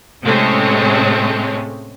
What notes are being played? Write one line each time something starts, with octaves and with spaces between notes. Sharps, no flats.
A2 C3 G#3 A3 C4 C#4